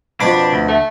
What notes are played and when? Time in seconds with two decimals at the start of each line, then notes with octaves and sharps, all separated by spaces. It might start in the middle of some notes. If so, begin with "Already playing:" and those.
0.20 F2 B2 D4 B5 D6
0.53 D2
0.68 A3